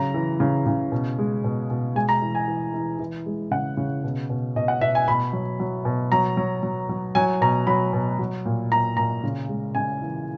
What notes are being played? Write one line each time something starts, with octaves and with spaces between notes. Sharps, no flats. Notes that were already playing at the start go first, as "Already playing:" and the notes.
Already playing: C#3 F#3 A#5
E3
C#3
C#3
B2
G#3
B2
B2
G#3 G#5
A#5
E3
G#5
E3
E3
E3
G#3
C#3 F#5
C#3
B2
B2
B2 D#5
F#5
B2 E5
G#5
B2 B5
F#3
F#3
B2
F#3 A#5
F#3
F#3
F#3
F#3 G#5
B2 A#5
F#3 B5
B2
F#3
A#2
A#2 A#5
A#2 A#5
C#3
G#3
C#3 G#5
E3